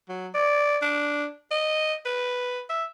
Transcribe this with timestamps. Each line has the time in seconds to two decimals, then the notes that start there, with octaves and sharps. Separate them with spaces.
0.09 F#3
0.34 D5
0.82 D4
1.51 D#5
2.06 B4
2.69 E5